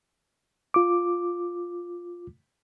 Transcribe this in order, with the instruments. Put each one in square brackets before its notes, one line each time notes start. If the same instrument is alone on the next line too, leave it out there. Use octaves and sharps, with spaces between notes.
[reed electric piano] F4 D6